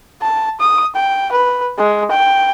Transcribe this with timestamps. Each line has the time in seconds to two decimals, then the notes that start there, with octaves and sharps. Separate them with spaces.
0.22 A5
0.60 D#6
0.95 G5
1.32 B4
1.78 G#3
2.11 G5